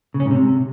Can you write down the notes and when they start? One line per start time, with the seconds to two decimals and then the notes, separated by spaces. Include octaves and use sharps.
0.14 C#3
0.20 C#4
0.25 G#2
0.31 C3